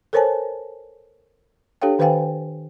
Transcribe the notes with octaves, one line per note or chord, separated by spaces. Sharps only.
A4 A#4 C5 C#5 G#5 A5
D4 G4 A4 C#5 F5 G5
D#3 B4 C5 F5 G5 G#5